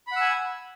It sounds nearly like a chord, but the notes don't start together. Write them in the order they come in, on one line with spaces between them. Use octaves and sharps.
B5 F#5 E6 G#5